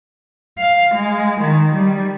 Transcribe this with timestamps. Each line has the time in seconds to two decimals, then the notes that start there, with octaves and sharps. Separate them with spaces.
0.58 F5
0.93 G#3
1.40 D#3
1.73 G3